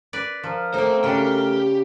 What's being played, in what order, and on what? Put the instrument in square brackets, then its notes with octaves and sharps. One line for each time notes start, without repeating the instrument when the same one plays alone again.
[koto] B4 D5
[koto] F3 [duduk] A#4
[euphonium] A3 [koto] A#3 D#4 [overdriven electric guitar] C4 C5
[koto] C#3 D4 [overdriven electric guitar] G4 G5